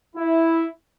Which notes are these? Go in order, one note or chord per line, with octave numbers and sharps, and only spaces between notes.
E4